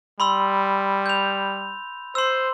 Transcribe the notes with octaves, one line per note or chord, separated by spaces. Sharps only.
G3 B5 C6 E6
G6 F7
C5 C6 E6